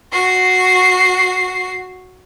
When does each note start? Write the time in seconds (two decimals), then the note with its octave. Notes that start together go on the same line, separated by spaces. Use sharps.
0.12 F#4 C7